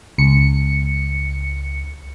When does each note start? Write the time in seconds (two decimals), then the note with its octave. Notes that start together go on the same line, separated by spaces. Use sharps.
0.18 C#2 C#7